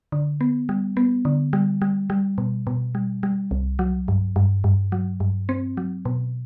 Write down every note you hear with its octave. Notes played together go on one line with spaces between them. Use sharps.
D3
B3
G3
B3
D3
G3
G3
G3
B2
B2
G3
G3
C2
F#3
G2
G2
G2
F#3
G2
C4
F#3
B2